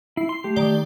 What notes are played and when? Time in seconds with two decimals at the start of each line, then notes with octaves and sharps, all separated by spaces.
0.17 E4 C7
0.29 C6
0.44 A3 G4
0.56 D#3 D5 G7